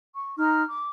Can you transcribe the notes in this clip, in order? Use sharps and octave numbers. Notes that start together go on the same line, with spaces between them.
C#6
D#4 A#5 C6 F6
D6